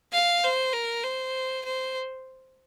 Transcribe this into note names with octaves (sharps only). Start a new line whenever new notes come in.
F5
C5
A#4
C5
C5